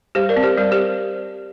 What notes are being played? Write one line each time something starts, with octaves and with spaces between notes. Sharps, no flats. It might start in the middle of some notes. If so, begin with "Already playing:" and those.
G3 G4 C5
A#4 D5
C4
G4 C5
G3 A#4 D5
G4 C5